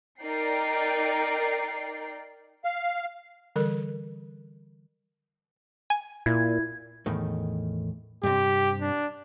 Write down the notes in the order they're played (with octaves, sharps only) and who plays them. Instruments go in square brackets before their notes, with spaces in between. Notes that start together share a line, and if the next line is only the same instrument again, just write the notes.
[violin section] D#4 A#4 D5 G5 C7
[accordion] F5
[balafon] D3 E3 G3 A4 A#4
[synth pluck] G#5
[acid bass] A#2 [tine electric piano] E4 [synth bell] G#6
[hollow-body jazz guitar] E2 A2 D#3
[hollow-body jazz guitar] G2 C3 [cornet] G4
[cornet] D4